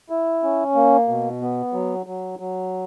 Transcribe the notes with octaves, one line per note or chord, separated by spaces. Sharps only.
E4
C#4
A#3
B2
B3
F#3
F#3
F#3